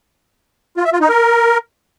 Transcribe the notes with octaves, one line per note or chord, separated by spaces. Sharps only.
F4
E5
F4
D#4
A#4